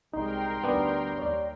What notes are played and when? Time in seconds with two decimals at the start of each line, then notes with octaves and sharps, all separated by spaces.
0.13 C2 G#3 D#4 A#4 G5 C6
0.64 D2 G3 B3 D4
1.18 D#2 C#5 D5